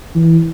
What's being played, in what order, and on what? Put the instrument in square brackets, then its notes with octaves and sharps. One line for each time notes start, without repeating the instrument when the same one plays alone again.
[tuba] E3